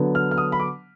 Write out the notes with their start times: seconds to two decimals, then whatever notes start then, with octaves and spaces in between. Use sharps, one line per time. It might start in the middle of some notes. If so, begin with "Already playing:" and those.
Already playing: D3 F#3 B3
0.15 F6
0.31 F6
0.38 D#6
0.52 B5
0.60 D6